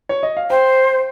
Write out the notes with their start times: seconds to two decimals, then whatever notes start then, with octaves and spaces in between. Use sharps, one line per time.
0.09 C#5
0.23 D#5
0.37 F5
0.50 C5 G5